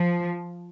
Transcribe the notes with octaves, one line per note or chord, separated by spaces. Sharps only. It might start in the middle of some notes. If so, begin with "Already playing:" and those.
Already playing: F3